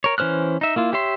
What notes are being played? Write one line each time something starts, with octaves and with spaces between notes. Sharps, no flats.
A#4 C#5
E3 C#4 C5 F6 F#6
D#4 E5
A#3 E4 F4
G4 C#5 E5 C6